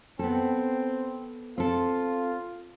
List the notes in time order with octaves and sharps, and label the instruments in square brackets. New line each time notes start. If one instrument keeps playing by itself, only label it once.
[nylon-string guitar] B3 A4 [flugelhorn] C4
[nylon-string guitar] C4 A4 [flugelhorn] F4